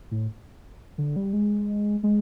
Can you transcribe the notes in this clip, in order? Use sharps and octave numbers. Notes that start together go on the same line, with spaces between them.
A2
D3
G3
G#3
G#3